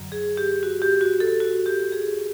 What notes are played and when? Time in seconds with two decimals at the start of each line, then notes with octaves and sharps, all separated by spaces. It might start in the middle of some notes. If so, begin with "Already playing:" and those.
Already playing: F#2 D3 F#3
0.12 G#4
0.37 G4
0.63 F#4
0.82 G4
1.01 F#4
1.20 A4
1.40 F#4
1.66 G4
1.92 G#4